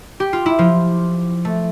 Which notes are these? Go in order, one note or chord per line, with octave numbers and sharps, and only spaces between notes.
G4
F4
E4
F3 F4
A3